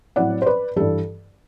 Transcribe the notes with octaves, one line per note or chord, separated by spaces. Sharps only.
A2 F#3 C4 E4 D5 F#5
C5
B4 D5
G2 E3 G3 A4